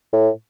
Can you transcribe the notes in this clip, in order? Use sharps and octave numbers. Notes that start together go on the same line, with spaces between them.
A2